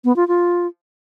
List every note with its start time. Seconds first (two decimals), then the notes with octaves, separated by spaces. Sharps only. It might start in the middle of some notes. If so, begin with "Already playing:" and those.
0.05 B3
0.16 F4
0.28 F4